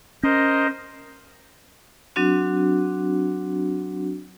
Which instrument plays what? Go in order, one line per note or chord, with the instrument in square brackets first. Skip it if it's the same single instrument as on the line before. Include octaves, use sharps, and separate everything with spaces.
[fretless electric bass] C#4 [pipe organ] A#4 C5 D#5
[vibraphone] F#3 C4 D4 F#4